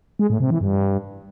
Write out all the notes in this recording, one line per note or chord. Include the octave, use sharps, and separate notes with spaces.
G#3
A2
C3
E3
G2